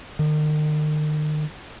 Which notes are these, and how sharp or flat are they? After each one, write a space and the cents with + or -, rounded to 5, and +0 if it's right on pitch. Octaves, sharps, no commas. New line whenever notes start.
D#3 -40